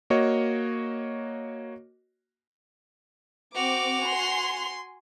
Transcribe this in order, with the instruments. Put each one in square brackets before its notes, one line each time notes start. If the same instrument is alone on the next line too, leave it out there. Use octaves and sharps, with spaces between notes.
[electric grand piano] A#3 F#4 C#5 D#5
[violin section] C4 D6 [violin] F#4 F7
[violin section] G#5 C6